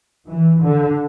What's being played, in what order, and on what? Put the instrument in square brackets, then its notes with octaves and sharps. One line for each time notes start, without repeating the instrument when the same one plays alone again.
[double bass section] E3
D3